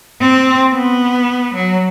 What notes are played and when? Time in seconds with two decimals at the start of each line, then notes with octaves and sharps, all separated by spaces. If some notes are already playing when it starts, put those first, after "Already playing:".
0.21 C4
0.75 B3
1.54 F#3